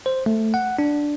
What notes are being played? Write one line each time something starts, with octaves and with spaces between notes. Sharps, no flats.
C5
A3
F#5
D4